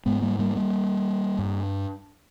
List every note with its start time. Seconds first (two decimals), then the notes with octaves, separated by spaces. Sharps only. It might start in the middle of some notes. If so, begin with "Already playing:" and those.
0.06 G#2 G#3 B3
0.22 G3 A#3
0.39 G3 A#3
0.55 G3 A#3
1.38 G2